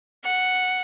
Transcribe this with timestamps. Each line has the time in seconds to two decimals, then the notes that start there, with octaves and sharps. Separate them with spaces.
0.25 F#5